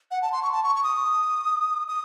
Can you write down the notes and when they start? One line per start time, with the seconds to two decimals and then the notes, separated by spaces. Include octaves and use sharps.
0.11 F#5
0.22 A5
0.32 C6
0.43 C#6
0.52 A5
0.63 C#6
0.76 C#6
0.83 D#6
1.88 D#6